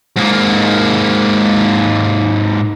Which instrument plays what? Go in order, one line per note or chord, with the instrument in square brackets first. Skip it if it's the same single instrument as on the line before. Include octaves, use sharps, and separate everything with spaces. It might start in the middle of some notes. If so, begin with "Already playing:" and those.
[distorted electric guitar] G#2 A#3